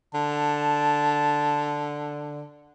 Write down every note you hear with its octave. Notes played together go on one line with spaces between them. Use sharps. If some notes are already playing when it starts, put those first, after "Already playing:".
D3 A5